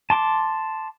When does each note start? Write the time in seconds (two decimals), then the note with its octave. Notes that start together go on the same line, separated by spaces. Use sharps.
0.10 A5 C6 D6